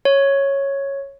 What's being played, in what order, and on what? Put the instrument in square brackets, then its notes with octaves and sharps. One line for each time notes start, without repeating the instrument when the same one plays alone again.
[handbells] C#5